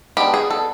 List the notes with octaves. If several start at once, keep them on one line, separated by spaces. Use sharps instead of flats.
G#3 B3 D4 G4
G#4
A4